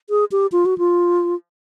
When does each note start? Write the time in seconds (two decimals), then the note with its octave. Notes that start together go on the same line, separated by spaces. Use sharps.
0.10 G#4
0.32 G4
0.52 F4
0.66 F#4
0.78 F4